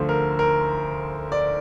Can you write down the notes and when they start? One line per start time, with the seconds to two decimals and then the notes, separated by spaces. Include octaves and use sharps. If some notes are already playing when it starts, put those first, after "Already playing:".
Already playing: D2 D3 F3 C5
0.09 A#4
0.39 A#4
1.32 D5